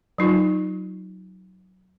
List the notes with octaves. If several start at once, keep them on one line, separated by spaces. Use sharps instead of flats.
F#3 D#4 F4